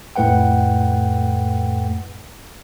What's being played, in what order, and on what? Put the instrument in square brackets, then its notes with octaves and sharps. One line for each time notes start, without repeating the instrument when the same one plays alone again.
[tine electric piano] F2 A2 A3 B4 F#5 G5